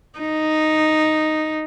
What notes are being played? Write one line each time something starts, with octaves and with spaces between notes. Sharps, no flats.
D#4